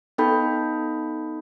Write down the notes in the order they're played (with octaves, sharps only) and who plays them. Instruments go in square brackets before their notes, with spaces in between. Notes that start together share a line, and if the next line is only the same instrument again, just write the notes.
[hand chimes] B3 D#4 A4 G5 B5 G6